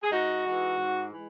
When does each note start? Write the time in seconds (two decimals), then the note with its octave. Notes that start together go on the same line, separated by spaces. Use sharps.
0.03 G#4
0.12 G#2 D#4 F#4
0.45 E3 G#3 D#4
0.78 G#2
1.12 E3 G#3